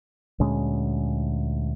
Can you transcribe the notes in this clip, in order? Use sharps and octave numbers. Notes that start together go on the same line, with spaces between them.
D2 A#2 G#3 C#4